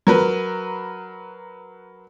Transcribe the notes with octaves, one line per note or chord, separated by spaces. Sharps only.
F#3 A#4 B4